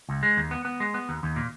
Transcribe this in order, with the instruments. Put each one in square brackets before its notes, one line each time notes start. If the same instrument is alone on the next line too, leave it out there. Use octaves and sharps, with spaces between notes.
[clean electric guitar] C#2
G#3
D#2
B3
B3
G#3
B3
D#2
D#2
A#2